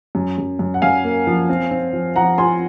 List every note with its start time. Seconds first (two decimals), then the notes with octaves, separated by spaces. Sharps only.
0.15 F#2
0.38 F#2
0.59 F#2
0.74 F#5
0.82 F#2 F5 G#5
1.04 A#3
1.27 F3
1.49 C4
1.71 C4
1.93 F3
2.16 F3 F#5 A#5
2.38 F4 G#5 C6